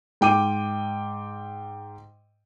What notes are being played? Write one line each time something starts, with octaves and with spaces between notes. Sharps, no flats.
G#2 G5 D6 D#7